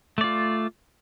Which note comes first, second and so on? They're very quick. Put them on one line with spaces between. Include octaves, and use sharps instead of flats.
A3 D5 F4